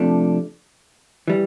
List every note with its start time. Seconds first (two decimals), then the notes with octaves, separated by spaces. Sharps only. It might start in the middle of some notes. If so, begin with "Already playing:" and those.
Already playing: C3 F3 A3 D4
1.28 E3 G3